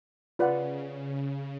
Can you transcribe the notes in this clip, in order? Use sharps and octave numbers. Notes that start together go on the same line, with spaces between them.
C#3 F4 B4 D5 F#5